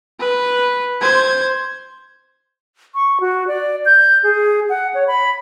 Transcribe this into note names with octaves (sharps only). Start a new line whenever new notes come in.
B4
C5 G#6
C#6
F#4
D5
G6
G#4
F#5
C#5
B5